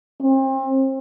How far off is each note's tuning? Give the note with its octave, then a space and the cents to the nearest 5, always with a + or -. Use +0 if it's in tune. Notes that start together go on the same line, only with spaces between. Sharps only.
C4 +35